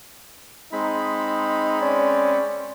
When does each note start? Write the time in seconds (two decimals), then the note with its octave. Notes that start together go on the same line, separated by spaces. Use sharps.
0.73 G#3 C4 D#4 B5
1.81 C#4 D5